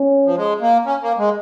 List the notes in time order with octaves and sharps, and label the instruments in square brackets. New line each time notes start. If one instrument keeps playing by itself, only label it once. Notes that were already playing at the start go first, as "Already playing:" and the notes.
Already playing: [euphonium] C#4
[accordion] F3
G#3
A#3
C#4
A#3
G#3